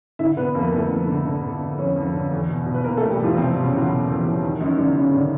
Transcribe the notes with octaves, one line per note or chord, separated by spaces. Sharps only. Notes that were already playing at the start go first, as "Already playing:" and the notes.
D3 E4 E5
D3 B3 B4
F2 A#3 A#4
D3 A3 A4
F2
D3
D3
D3
D3
F2 C#4 C#5
F2
D3
E2
B2
B2
B4
B2 A#3 A#4
A3 A4
B2
G3 G4
E2 F3 F4
E2 C3 C4
B2
C#3 C#4
E2 F#3 F#4
B2
E2
E2
D#3
F#2 D#3 D#4
F#2 D3 D4
F#2 C#3 C#4
D3 D#3 D4